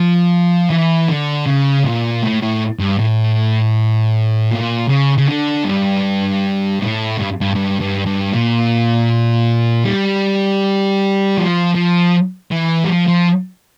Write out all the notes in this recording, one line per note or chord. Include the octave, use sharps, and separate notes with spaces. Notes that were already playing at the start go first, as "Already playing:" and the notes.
Already playing: F3
E3
D3
C#3
A#2
A2
A2
G2
A2
A#2
C#3
C#3
D3
G2
A2
G2
G2
G2
G2
G2
A#2
G3
F3
F3
E3
G3
F3
F3